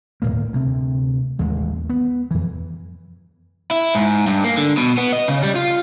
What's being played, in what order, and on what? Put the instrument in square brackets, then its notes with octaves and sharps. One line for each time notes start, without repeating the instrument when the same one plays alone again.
[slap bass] D1 F2 A2 A#3
D2 C3
A1 D#2 G#3
B3
F2 E3
[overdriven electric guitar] E4
G#2
G2
A#3
D3
B2
B3
D#5
C#3
G3
F4